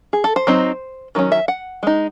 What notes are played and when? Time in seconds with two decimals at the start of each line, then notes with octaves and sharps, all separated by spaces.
0.13 G#4
0.24 A4
0.36 C5
0.47 F#3 C4 D#4
1.15 D#3 F#3 C#4
1.32 E5
1.48 F#5
1.83 G#3 D#4